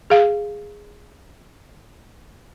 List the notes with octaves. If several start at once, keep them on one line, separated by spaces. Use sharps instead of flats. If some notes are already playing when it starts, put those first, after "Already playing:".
G#4 F5